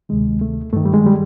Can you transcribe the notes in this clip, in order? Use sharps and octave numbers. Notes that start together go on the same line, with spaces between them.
D2 C3 D#3 G#3
A3
G2 D#3 A3
G3
G#3
G3